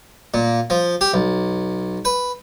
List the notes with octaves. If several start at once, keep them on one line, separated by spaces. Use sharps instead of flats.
A#2
F3
G4
B1
B4